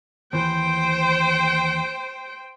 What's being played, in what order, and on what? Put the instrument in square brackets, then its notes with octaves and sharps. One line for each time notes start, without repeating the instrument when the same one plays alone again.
[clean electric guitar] D#2 E3 [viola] C5 G5